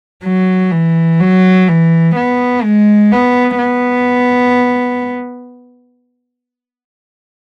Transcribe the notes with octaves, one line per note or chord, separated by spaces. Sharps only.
F#3
E3
F#3
E3
B3
G#3
B3
B3